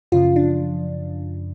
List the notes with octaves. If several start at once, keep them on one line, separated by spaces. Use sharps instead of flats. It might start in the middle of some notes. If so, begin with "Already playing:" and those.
F#2 C#3 F3 F4
D4